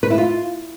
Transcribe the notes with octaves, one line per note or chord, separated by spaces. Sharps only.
B4
E4
F4